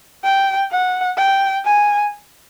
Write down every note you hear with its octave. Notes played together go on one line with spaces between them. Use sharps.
G5
F#5
G5
G#5